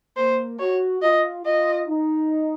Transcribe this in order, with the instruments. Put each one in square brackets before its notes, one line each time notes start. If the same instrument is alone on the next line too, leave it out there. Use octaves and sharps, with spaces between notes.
[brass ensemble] A#3 [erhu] C5
[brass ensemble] F#4 [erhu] C#5
[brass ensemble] F4 [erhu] D#5
[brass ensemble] F4 [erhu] D#5
[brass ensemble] D#4